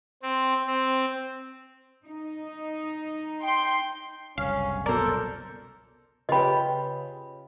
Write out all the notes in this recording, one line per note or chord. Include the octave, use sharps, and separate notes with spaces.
C4
C4
D#4
G5 C6
F#1 C2 C#4 F5
B2 A4 A#4 C5 D5
C#3 F4 G4 B4 D#5 B5